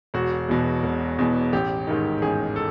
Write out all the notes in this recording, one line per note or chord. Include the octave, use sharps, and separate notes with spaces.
E1 F#4
E2 B2
E1
E2 B2
A1 G4
G#2 D#3
A1 G#4
A4